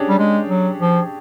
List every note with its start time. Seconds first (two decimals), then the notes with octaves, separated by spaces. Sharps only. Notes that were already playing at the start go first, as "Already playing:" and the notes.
Already playing: C#4 D4 G4 G#4
0.09 G3
0.19 G#3
0.49 F#3
0.79 F3